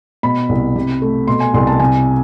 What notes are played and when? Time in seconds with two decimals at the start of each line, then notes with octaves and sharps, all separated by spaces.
0.23 B2 B5
0.49 C2
0.76 C3
1.02 A3
1.27 B2 C6
1.40 G#5
1.54 C2 C6
1.67 A5
1.80 C3 G#5